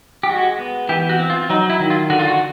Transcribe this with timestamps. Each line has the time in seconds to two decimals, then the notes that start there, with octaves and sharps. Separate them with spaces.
0.23 G4
0.29 G#3 F#4
0.59 B3
0.89 E3 G4
1.09 F#4
1.19 C4
1.30 F4
1.50 F#3 D#4
1.70 E4
1.80 D#3
1.90 F4
2.10 D3 F#4
2.19 F4
2.28 F#4